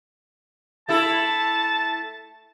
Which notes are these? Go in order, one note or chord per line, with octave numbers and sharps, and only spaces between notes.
A3 E4 A4 A5